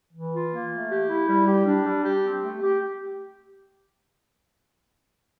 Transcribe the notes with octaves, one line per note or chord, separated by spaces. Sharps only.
E3
F4
A#3
A3
G4
E4
G3
G4
D4
G3
G4
C4
A3
G4